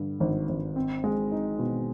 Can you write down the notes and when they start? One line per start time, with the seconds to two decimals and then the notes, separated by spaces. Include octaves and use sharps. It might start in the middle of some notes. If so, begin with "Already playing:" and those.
Already playing: G2 D3
0.20 G#1
0.49 G#1
0.76 C4
1.04 G#3
1.32 D#4
1.59 B2